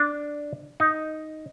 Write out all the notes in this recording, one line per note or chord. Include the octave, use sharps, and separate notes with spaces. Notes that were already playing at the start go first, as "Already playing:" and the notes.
Already playing: D4
D#4